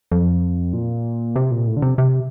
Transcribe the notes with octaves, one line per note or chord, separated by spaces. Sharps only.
F2
A#2
C3
A#2
A2
D3
C3
C3